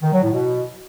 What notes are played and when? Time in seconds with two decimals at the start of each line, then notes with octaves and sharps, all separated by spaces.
0.02 D#3
0.12 F#3
0.23 A2
0.33 B2